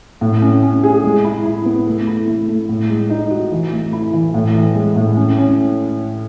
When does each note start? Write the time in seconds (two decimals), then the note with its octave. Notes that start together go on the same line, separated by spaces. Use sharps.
0.21 A2
0.42 C#4
0.63 C#4
0.84 G#4
1.04 G#3
1.24 E4
1.46 E4
1.65 B3
1.87 A3
2.07 E4
2.27 A3
2.48 A3
2.69 A2
2.90 G#3
3.10 D#4
3.31 F#4
3.51 E3
3.72 A3
3.93 E4
4.14 E3
4.34 A2
4.55 E3
4.75 G#3
4.96 A2
5.16 C#4
5.38 C#4